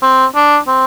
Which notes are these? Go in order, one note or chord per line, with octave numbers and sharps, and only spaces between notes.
C4
D4
C4